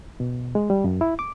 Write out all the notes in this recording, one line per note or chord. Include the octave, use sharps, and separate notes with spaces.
B2
G#3
G3
F#2
E4
D6